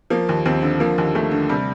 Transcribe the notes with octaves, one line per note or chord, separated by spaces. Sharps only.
F3 A#3
D#2
D#2 C4
D3
F3 A#3
D#2
D#2 A3
D3
C3 G3